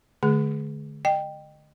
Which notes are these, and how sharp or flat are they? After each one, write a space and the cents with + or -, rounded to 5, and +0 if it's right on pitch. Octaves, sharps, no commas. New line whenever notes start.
D3 +10 A3 -45 G#4 +0
D#5 -30 G5 +0